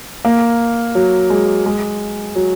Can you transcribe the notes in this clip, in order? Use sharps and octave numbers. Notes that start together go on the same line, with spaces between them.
A#3
F#3
G#3
G#3
F#3